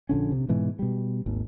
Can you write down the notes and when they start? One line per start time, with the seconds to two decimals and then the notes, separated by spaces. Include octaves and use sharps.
0.09 A#1 D3 C#4
0.32 C3
0.48 G#2 B2 E3 G#3
0.79 B2 G3
1.26 G#1 D#2